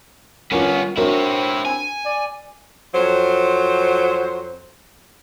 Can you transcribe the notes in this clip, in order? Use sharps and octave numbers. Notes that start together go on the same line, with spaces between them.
G2 B3 C#4 F4 A#4
C4 D4 E4 F#4 A#4 C#5
G#5
D5
F2 F#3 C5